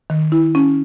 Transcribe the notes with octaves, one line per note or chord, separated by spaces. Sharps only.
D#3
E4
C#4